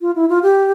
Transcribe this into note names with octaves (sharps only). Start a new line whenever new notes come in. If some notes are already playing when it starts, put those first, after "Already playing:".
F4
E4
F4
G4